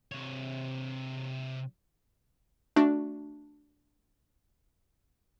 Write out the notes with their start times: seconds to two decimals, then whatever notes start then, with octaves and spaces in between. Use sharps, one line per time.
0.12 C3 C#5
2.76 A3 D4 F#4